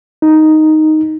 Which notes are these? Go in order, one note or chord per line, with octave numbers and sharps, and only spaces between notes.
D#4